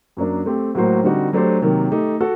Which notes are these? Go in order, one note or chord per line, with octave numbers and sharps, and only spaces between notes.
F#2 F#3 A#3 D4
A3 C4 G4
A2 F#3 A#3 F#4 C5
D3 G3 C4 D#4 F#4
F#3 A3 D4 G4 C5
C3 D#3 F#3 A#3
A3 D#4 G4
F#4 A4